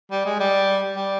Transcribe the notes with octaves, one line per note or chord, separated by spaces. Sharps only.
G3
G#3
G3
G3